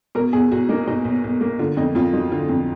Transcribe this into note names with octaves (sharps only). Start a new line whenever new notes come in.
B2 A#4
B1 G#4
B1 F#4
A#3 D#4
B2 D#4
B1
B1
A#3
D3 F4
F2 D#4
F2 F4
F#3 D#4
D3 F4
F2